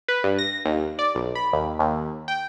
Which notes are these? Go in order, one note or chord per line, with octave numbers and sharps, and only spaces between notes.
B4
G2
A#6
D#2
D5
B1
B5
D#2
D#2
G5